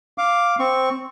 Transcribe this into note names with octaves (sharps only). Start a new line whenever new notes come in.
F5 D6
C4 C#6